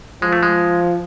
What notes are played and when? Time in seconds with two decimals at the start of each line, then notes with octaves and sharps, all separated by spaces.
0.22 F3 G#3
0.33 A3
0.43 G#3